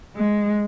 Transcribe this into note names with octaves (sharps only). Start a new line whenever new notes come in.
G#3